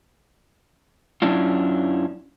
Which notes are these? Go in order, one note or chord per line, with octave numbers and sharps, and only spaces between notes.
F#2 F#3 C#4 D4 E4 F4